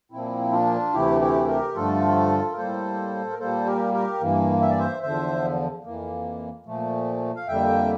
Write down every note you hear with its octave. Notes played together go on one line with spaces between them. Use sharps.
A#2 F3 A#3 C4 E4
D4 F4
D2 C3 E3 A3 E4 G4
E4 G4
G4 A#4
G2 D3 F3 A3 F4 A4
A#4
A2 G3 A#3 A4 C5
A#4
A#2 G3 A#3 A4 C5
G4 A#4
G4 A#4
G2 E3 A#3
E5
D5
C5 E5
E2 D3 F3 C5 E5
F2 E3 A#3
A#2 F3 A3
F5
F2 D3 G3 A#3 E5 G5